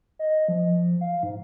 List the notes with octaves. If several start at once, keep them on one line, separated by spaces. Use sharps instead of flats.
D#5
F3
F5
G#2